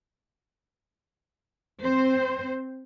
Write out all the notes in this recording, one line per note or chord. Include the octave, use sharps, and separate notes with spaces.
C4 C5